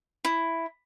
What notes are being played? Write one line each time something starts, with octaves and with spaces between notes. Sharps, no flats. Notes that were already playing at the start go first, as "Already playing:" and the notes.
E4